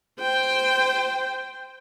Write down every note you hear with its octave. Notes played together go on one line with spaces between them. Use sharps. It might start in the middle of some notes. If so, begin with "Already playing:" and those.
C5 G5